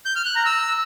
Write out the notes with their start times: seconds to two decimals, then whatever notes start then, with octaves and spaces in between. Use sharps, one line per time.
0.05 G6
0.15 F6
0.25 F#6
0.35 A#5
0.45 E6